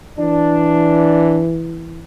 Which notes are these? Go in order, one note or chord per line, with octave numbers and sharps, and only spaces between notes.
E3 D4